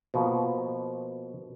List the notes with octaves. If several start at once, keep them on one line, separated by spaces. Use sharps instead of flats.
B2 F3 A#3